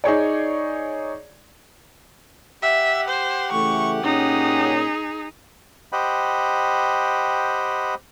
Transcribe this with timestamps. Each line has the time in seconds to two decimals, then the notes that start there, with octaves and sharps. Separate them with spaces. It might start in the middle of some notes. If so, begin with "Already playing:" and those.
0.04 D#4 G#4 C#5 D5
2.63 G4 E5 F#5
3.09 C5
3.52 C#3 E3 A3 C#6
4.04 A#2 C#4 D#4 G#4
5.92 G4 C5 D#5 F#5 G5 B5